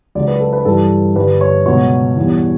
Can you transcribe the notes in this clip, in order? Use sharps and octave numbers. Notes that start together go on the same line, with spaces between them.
C#2 C#3 F#3 D5
B4
A4
B4
G2 E3 G3 A4
G2 D3 G3 B4
C#5
C#2 B2 F#3 C#5
E2 B2 G3